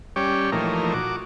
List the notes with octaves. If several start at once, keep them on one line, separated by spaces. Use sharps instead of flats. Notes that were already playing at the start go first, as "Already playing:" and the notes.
G3 C#4 G4 C#5 D5
A#2 E3 F3 A3 D#4 A#4
F#4 D6